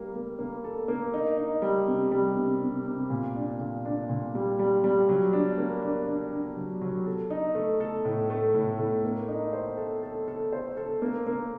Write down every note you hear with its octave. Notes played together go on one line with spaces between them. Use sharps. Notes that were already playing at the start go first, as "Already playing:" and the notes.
Already playing: G3 A#3
A#3
A#3
A4
A#3
D#4
D#4
G3
C3
G3
C3
C3
C3
A#2
D4
A#2
D4
A#2
G3
G3
G3
F#3
D4
A#3
D4
D4
D4
F#3
F#3
A4
D#4
A3
A4
A2
A3
A2
A2
A#3
D#4
C5
A4
A4
A4
C5
A4
A#3
A#3